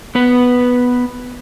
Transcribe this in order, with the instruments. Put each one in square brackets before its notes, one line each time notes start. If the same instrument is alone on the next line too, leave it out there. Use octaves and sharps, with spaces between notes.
[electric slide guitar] B3 B4